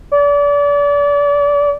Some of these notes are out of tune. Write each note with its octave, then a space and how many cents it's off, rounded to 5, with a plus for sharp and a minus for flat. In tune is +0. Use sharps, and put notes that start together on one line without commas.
D5 -30